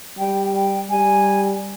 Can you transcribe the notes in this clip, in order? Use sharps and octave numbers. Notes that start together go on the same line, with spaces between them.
G3 G5
G5
G3 G#5